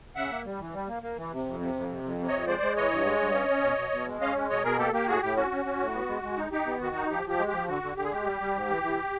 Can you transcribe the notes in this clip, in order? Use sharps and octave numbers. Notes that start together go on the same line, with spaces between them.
C#3 E5 F#5
A#3
G3
E3
G3
A#3
A#3
E3
C3
F2
C3
F2
C3
F2
C3
F2 C#5 D#5
G#3 C5 D5
G#3
E3 C#5 D#5
G2
G#3
G2
C#4
C#4
B2
B2
B2
G#3
C#4 D#5 F5
G#3
B2 C#5 D#5
B2 G#4 A#4
A#3 G4 A4
A#3 G4
A2 F#4 G#4
A2 G4
C#4 F#4
C#4
C#4
A2
B3
G#3
G#3
D#4
D#4 G4
B3
D#3 F#4
D#4
F3 G4
F3 G4
G#3
F3 G4
D3 F#4
D3
D3 G4
G#4
G#3 G4
G3
G3
G#2
E3
E3